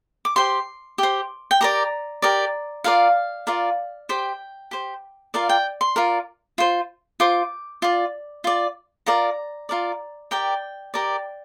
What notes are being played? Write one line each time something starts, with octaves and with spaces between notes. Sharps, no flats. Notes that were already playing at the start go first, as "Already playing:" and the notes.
D6
G4 C5 C6
G4 C5
G5
G4 A#4 D5 A#5
G4 A#4 D5
F4 A#4 D5 F5
F4 A#4 D5
G4 C5 G5
G4 C5
F4 A#4 D5 F5
G5
C6
F4 A#4 D5
F4 C5
F4 C5 D6
F4 D5
F4 D5
F4 A#4 D5 A#5
F4 A#4 D5
G4 A#4 D5 G5
G4 A#4 D5